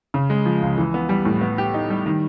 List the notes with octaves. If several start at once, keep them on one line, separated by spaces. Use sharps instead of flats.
C#3
G#3
F3
C#2
E3
B3
G3
A2
B3
G4
D#4
G3
D#3